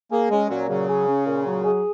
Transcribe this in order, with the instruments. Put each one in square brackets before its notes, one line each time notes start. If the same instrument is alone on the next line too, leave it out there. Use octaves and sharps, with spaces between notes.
[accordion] A#3 [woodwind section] G#4
[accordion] G#3 [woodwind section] C#4
[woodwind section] A#2 [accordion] F#3
[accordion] C#3 [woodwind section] F#3
[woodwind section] G#4
C#4
A#2
F#3
G#4